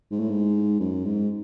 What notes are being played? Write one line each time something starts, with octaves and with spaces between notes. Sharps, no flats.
G#2
A2
G#2
F#2
G#2